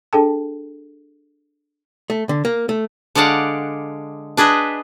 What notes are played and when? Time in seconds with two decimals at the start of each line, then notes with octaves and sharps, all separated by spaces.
0.13 D4 G#4 A4 G5 A5
2.10 A3
2.29 D3
2.45 A#3
2.69 A3
3.15 D3 G#3 D5 F5 F#5
4.37 D4 G#4 B4 D#5 E5